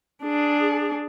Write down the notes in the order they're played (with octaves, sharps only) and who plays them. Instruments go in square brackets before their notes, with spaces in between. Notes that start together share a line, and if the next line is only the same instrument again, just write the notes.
[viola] D4 G#4